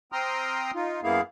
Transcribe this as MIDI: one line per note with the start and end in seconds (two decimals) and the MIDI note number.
0.12 0.71 60
0.12 0.71 79
0.12 0.71 82
0.12 0.71 84
0.12 0.71 87
0.12 0.71 89
0.75 1.01 63
0.75 1.01 65
1.03 1.21 42
1.03 1.21 58
1.03 1.21 59
1.03 1.21 64
1.03 1.21 68
1.03 1.21 77